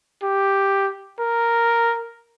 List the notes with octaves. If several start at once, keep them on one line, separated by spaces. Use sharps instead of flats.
G4
A#4